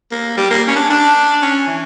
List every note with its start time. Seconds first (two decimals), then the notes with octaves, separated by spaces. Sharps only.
0.12 A#3
0.37 G3
0.51 A#3
0.68 C#4
0.76 D4
0.90 D4
1.42 C#4
1.67 E3